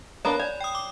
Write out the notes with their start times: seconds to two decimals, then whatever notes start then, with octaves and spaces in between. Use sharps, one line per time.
0.25 A#3 B3 D4 C#5 B5
0.40 D5 G#5
0.60 G5 D#6
0.75 D6